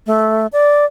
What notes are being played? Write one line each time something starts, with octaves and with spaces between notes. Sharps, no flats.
A3
D5